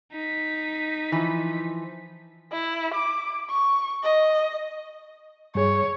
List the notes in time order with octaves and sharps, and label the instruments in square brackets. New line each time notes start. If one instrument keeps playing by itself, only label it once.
[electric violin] D#4 B6
[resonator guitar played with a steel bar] E3 F3
[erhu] E4
D6
C#6
D#5
[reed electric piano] G2 G#4 [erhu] C#5